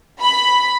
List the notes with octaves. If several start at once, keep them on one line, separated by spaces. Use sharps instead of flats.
B5